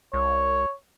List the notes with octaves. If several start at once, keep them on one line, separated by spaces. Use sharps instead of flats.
C2 C#5